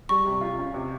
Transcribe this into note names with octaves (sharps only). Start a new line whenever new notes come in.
G3 C#6
C3
F4
C#4
C3